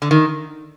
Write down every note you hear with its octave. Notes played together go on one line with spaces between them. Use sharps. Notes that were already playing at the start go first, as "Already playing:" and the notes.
D3
D#3